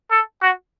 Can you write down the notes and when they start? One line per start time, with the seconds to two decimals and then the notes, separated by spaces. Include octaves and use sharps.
0.11 A4
0.42 F#4